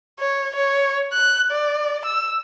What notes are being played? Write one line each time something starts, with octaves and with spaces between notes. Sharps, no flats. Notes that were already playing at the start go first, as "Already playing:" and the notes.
C#5
C#5
F#6
D5
E6